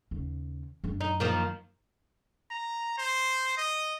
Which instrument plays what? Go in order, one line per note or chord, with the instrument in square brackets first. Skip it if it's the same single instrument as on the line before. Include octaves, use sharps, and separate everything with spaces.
[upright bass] D#2 C#3
F#2 D4
[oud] D#4
D#3 F3 A#3
[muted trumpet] A#5
C5
D#5